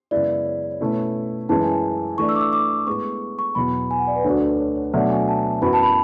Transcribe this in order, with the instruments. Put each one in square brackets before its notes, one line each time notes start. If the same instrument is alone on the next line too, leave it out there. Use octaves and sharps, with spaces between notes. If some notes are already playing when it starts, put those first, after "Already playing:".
[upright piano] F#2 C#3 G#3 B3 E4 [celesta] D5
[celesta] C#5
D5
C#5
[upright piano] B2 A3 C#4 E4 [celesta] B4
[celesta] C#5
[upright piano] F#2 E3 G#3 C#4 [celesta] A5
[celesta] G#5
A5
[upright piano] E3 A3 D4 [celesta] C#6
[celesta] E6
D6
E6
D6
[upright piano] A2 G#3 B3 [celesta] C#6
[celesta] C#6
[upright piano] E2 B2 F#3 [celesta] B5
[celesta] G#5
F#5
D5
B4
[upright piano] D2 D3 A3 D4 F#4 [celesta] C#5
[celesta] B4
C#5
C#5
[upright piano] B2 F#3 A3 D4 [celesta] E5
[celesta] G#5
A5
[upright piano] F#2 E3 B3 F#4 B4 [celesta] B5
[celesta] A5
B5